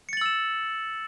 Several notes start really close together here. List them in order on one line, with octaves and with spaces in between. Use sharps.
C#7 A6 F#7 E6 E7